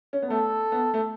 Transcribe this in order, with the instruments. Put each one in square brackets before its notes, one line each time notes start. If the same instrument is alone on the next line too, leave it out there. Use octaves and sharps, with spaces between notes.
[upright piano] C#4
B3
[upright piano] A3 [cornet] A4
[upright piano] B3
A3